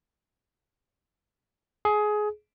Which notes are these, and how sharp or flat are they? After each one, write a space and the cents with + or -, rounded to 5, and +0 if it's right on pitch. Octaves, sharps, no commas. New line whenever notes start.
G#4 +20